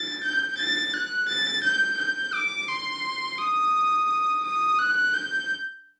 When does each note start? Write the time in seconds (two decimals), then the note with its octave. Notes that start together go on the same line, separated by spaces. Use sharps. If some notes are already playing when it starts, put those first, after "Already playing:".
Already playing: A6
0.23 G6
0.58 A6
0.94 F#6
1.28 A6
1.63 G6
1.98 G6
2.33 D6
2.68 C6
3.38 D#6
4.44 D#6
4.78 F#6
5.14 G6